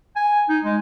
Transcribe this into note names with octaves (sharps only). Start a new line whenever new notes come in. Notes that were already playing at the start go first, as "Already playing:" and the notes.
G#5
D#4
G#3